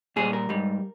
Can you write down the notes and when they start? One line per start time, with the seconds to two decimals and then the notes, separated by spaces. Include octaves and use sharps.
0.16 A#2 G3 G#4
0.33 A#4
0.49 G#2 G3